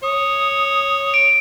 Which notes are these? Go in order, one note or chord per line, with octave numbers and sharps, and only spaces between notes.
C#5 D#6
D7